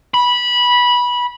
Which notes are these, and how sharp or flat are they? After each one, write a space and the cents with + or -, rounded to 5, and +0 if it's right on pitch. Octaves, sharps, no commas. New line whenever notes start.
B5 -15